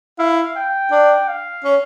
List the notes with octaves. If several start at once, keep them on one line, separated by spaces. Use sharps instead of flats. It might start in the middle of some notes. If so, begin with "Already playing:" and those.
E4 F5
G5
D4
F5
C#4